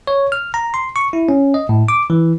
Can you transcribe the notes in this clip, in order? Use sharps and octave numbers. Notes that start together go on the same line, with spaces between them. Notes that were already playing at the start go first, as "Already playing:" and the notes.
C#5
F6
A#5
C6
C#6
E4
C#4
D#5
A2
D6
E3